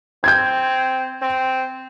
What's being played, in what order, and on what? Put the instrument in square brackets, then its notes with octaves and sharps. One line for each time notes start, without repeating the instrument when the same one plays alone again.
[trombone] C4 [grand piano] G6 G#6
[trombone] C4